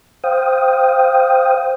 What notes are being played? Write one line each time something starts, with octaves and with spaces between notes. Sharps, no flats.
C5 F5 G5 D#6